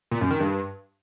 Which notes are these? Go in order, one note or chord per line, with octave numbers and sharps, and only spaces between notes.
A#2
F#2
D#3
G2